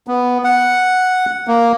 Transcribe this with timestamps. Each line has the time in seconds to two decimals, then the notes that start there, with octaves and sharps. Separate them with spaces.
0.07 B3
0.44 F#5
1.47 A#3